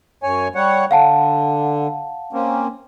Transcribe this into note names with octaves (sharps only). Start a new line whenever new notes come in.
F#2 C#5 G#5
G3 C#5 F#5
D3 F5 F#5 A5
A#3 C4 C#4